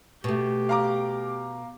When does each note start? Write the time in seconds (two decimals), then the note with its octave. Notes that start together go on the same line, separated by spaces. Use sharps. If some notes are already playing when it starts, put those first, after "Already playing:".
0.24 B2 A3 G4
0.69 F5 A#5 D6